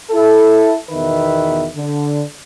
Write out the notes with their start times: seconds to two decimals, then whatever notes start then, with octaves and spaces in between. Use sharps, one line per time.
0.11 E4 A4
0.91 E2 B2 D#3 B4 E5
1.76 D3